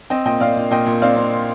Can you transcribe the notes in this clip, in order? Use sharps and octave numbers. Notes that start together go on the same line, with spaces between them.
C4 D#5 G5
A#2 D#5 G5
A#2 D5 F5
A#2
A#2 D#5 G5
A#2
C4 D5 F5
C4